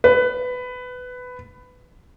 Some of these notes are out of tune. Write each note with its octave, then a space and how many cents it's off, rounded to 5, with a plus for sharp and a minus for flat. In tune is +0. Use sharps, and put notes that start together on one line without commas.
B4 +15